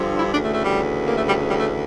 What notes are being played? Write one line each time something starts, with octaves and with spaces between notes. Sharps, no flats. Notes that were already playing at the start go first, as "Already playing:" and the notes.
Already playing: G2 D3 F3
E4
D2 C#3 E3 D4
A3
A3
G3
A#3
A3
G3
G3
A3